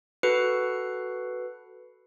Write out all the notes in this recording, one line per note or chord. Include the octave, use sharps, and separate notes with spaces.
F#4 A4 B4 C7 C#7